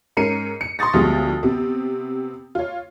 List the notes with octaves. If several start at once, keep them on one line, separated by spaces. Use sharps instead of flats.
G#2 C#4 A#4 C7 C#7 D#7
C#7
C6 C#6 D#6 A6 A#6
D2 F3 G3 G#3 B3
C3 B3 C4
F4 C#5